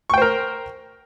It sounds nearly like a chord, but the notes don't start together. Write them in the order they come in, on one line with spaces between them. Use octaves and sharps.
C#6 G5 C5 A#4